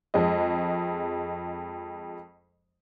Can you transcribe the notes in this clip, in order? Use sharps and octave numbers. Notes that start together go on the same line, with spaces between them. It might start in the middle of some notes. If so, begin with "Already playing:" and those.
F2 G#3 D#5